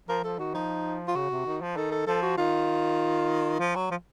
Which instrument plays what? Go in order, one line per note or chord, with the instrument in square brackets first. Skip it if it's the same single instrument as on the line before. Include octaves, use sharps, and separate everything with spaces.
[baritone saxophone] F3 [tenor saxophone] A#4
[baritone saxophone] F3 [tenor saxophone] A4
[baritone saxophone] D#3 [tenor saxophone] F#4
[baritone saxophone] F3 [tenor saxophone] D#4
[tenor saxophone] F4
[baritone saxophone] C#3 [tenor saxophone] F#4
[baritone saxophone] C3
D#3
F3
[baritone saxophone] D#3 [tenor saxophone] A4
[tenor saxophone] A4
[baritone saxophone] F3 [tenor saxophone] A4
[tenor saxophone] F#4
[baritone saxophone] D#3 [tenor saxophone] F4
[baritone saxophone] F3
F#3
F3